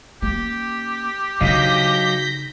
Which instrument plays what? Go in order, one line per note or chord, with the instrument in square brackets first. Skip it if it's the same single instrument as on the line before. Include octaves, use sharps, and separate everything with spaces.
[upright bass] A#3 C#4 [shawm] G4
[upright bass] C#3 D#4 [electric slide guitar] F#3 D#5 F5 [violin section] G6 A#6 B6